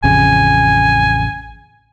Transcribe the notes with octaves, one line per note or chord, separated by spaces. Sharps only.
A1 F2 C#3 G#5